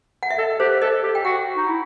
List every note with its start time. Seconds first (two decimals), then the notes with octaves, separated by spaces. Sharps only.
0.23 F#5
0.30 E5
0.38 A4 D#5
0.60 G4 C5
0.82 A4 D#5
1.03 G4
1.15 G5
1.25 F#4 F#5
1.56 D#4
1.68 E4